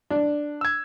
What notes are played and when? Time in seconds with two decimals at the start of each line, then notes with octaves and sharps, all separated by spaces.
0.10 D4
0.61 E6 G#6